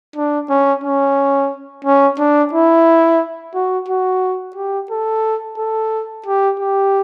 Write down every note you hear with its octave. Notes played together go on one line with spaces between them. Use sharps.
D4
C#4
C#4
C#4
D4
E4
F#4
F#4
G4
A4
A4
G4
G4